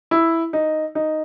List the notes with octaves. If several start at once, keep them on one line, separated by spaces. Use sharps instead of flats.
E4
D#4
D#4